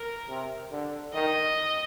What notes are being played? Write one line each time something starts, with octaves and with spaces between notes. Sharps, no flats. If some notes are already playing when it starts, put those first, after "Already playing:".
Already playing: A#4
C3
D3
D#3 D#5